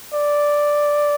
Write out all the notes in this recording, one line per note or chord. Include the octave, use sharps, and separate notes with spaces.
D5